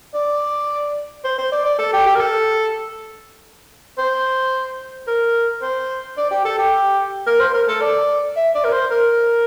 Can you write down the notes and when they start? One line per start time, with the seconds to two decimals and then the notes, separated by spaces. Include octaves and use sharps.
0.14 D5
1.24 C5
1.38 C5
1.52 D5
1.65 D5
1.79 A4
1.93 G4
2.06 G4
2.15 A#4
2.20 A4
3.98 C5
5.08 A#4
5.62 C5
6.17 D5
6.31 G4
6.45 A4
6.58 G4
7.27 A#4
7.40 C5
7.54 A#4
7.68 A4
7.81 D5
8.36 E5
8.55 D5
8.64 A#4
8.72 C5
8.91 A#4